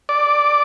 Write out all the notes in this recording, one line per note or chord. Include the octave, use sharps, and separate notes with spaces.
D5